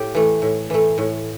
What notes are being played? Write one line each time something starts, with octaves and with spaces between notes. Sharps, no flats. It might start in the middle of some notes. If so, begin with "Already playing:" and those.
Already playing: A2 G4
E3 A3
A2
E3 A3
A2